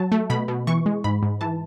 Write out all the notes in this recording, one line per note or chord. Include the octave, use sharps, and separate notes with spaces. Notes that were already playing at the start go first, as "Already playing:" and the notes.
Already playing: F#3 A5
A3
B2 B5
B2
E3 C#6
G#3
G#2 B5
G#2
E3 A5